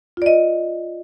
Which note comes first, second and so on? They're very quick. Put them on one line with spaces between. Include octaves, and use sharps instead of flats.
F4 D5 D#5